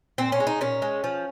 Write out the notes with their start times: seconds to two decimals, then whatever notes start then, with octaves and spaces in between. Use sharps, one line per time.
0.18 A#2 C4
0.32 C#4
0.40 G#3
0.47 D#4
0.61 A#2 C#4
0.82 G#3
1.04 F3